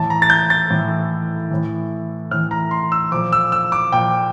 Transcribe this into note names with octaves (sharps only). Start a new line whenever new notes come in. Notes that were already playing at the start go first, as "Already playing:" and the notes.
Already playing: A2 E3 A5
A#5
A6
G6
A6
A2 E3
A2 E3
A2 E3 F6
A#5
C6
E6
A#2 F3 D6
E6
E6
D6
A#2 F3 G5